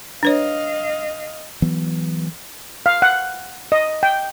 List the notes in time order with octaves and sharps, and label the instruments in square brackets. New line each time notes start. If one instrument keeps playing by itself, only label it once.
[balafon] D4 B4 C#5 [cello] D#5 F5
[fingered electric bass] E3 F#3 B3
[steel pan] F5
F#5
D#5
G5